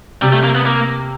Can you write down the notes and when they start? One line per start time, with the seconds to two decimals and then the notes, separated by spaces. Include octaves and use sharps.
0.22 C3 G3
0.32 A3
0.44 A#3
0.55 B3
0.66 A#3